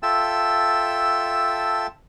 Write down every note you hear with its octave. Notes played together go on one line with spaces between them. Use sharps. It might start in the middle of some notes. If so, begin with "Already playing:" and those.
F4 A4 E5 G5 A5 E6